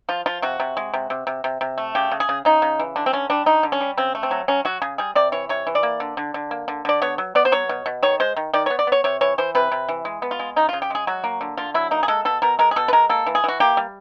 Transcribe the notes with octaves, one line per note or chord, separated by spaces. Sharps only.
F3 F4
F3 F4
C3 F#4
C3
G#3
C3
C3
C3
C3
C3
A3
C#3 G4
C#3
G#4
C#3
C#3 D#4
C#3
E3
D3 D4
C4
D3 C#4
G3 D4
D3 D#4
D3
C#4
G3
C#3 C4
A3
C4
F#3
F#3 C#4
F#3 F#4
C#3 G#4
G3 G#4
C3 D5
E3 C#5
C3 C#5
E3
D5
A#3
D3
D3
D3
A#3
D3
D3 D5
B3 C#5
F#3
B3 D5
C5
F#3 C#5
B2
B2
D#3 C#5
G#3 C5
D#3
D#3 D5
C#5
B3
D5
B3 C#5
C3 C#5
E3 C#5
E3 C5
C3 B4
C3
E3
G#3
B3
F4
G#3
C#3 D#4
F4
C#3
G4
G#3 G#4
F#3 F#4
A#3
D3
D3 F4
F#3 E4
A#3 D#4
G#4
G#3 A4
B2 A4
B2 A#4
G#3 A#4
G#4
B2 A4
B4
G#3 A#4
A#3 A4
E3
G#4
E3 F#4
A#3 G4
G3